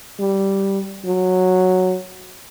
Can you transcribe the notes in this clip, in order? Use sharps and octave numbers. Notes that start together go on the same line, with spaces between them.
G3
F#3